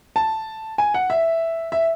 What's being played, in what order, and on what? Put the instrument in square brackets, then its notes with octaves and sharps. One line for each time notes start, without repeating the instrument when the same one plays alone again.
[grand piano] A5
G#5
F#5
E5
E5